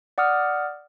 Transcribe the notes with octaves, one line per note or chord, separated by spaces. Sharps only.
D5 F#5 D6 D#6 F6